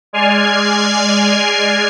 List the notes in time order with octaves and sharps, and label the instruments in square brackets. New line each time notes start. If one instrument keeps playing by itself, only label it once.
[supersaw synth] G#3 D5 G#5 F6 G#6 C7